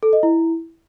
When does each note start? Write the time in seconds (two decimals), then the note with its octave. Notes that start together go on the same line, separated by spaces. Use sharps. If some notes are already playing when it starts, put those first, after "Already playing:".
0.03 A4
0.13 D#5
0.23 E4